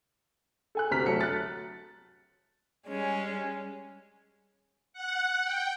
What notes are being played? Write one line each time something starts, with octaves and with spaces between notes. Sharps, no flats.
A4 G#5 F#6
D2 C3 A#5 F6 B6
F#3 A3 A5 C#7
F#6 A6
G3 G#3 C#4
F#5
G5